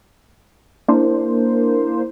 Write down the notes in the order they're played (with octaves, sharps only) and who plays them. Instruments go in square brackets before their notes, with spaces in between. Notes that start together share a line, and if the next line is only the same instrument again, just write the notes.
[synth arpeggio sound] A#3 D4 E4 A#4 C5